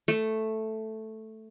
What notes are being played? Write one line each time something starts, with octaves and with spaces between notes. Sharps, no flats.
A3